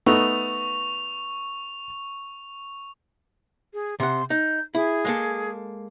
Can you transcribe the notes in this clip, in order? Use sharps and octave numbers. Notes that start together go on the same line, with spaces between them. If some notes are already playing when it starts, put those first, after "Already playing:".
A3 B3 D#4 C#6 F7
G#4
C3 F#5 C6
D#4 G6
E4 G#4
G#3 A#3 A4